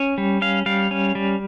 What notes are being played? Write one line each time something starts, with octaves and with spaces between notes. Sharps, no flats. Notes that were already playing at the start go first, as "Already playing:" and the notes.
Already playing: C#4
G3
C#4 F5
G3 F5
C#4
G3